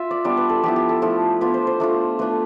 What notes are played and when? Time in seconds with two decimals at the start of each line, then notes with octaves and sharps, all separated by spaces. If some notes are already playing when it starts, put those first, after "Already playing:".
Already playing: F4 E5
0.11 D5
0.24 G3 B3 D4 D5
0.37 B4
0.49 A4
0.63 F3 B3 E4 G4
0.76 G4
0.89 A4
1.02 F3 A3 E4
1.41 B3 D4 F4 B4
1.54 C5
1.67 C5
1.80 A3 D4 F4
2.19 A3 D4 F4 B4